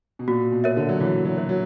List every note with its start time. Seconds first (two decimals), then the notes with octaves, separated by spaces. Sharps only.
0.19 B2
0.28 A#2 F#4
0.52 B2
0.64 A#4 C#5 E5
0.77 D3
0.89 F#3
1.00 E3 F#4
1.25 F#3
1.37 A#4 C#5 E5
1.49 F#3